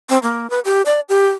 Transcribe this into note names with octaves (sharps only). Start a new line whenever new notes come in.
C4
A#3
B4
G4
D5
G4